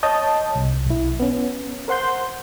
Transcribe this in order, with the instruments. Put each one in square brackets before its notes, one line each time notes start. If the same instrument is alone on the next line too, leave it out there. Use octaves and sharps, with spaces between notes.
[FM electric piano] C#5 D#5 A5 D#6 G6
C2
B1 E4
B3 C#4
A#4 C5 F#5 C6 G6